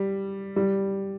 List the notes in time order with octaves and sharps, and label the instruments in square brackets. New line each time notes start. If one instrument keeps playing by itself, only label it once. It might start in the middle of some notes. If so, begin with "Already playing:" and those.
Already playing: [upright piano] G3
G3